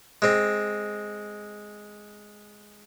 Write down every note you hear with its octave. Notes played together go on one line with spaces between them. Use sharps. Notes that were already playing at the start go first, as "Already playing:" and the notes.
G#3 C4